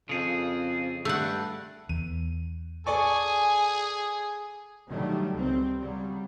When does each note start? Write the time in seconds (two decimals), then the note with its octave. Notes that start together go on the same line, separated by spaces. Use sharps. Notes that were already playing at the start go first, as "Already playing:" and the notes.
0.09 F2 C#3 G#4
1.05 G2 A3 F#5
1.89 E2 D#7
2.87 G#4 A4 D5 G#5 C#6
4.88 D3 D#3 F#3 G3 A3
5.33 C#2 G3 C4
5.78 C#3 F#3 G3